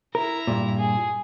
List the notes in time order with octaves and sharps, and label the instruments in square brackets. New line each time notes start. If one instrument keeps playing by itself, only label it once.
[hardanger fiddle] E4 A#5 [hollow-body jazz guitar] A#4
[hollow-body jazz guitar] G2 A#2
[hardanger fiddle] G#4